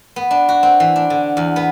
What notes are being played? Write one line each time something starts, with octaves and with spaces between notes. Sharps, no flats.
B3
D4
F#4
C4
E3
D4
D3
E2
B3